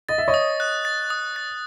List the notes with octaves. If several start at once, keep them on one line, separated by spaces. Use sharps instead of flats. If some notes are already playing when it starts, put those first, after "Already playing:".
D#5 A6
E5
C#5 D#5
D#6
F#6
A6
D#6
A6